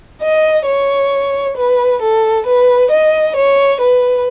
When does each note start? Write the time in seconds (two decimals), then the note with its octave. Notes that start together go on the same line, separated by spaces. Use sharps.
0.22 D#5
0.67 C#5
1.57 B4
2.02 A4
2.47 B4
2.91 D#5
3.36 C#5
3.81 B4